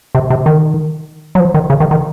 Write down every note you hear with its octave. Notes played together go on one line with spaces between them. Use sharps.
C3
C3
D#3
F#3
F3
D#3
C#3
D#3
D#3